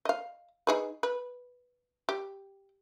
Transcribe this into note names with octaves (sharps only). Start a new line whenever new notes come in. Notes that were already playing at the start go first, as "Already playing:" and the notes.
D#5 F5
D#4 G#4 B4
B4
G4